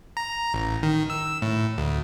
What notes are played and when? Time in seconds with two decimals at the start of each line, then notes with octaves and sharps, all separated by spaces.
0.17 A#5
0.54 A1
0.83 D#3
1.10 E6
1.42 A2
1.78 D2